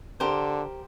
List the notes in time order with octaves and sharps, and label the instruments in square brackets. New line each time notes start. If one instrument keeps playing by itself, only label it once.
[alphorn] D3 [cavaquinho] G4 A#4 C5